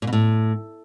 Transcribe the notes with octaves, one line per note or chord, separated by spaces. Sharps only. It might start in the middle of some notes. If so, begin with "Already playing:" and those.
A#2
B2
A2